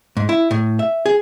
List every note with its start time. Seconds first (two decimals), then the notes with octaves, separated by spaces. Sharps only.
0.17 G#2
0.29 E4
0.51 A2
0.79 E5
1.06 G#4